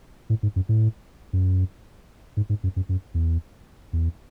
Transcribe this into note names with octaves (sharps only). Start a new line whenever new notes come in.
A2
G#2
F#2
A2
F#2
G#2
G#2
F#2
F#2
F#2
E2
E2